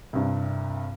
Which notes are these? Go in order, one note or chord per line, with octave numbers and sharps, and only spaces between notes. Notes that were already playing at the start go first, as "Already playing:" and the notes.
C2 G2 C3